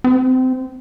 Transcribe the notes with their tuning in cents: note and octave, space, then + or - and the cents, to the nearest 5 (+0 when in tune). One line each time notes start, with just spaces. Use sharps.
C4 -25